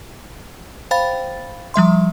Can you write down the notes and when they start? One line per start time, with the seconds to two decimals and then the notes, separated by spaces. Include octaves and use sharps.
0.91 C5 F5 G5 B5 A6
1.74 F3 G3 E5 C6